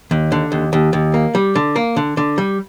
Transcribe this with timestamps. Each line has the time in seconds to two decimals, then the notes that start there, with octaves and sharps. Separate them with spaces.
0.11 D#2
0.32 D3
0.52 D#2
0.73 D#2
0.93 D#2
1.14 A#3
1.35 G3
1.55 D3
1.76 A#3
1.97 D3
2.17 D3
2.38 G3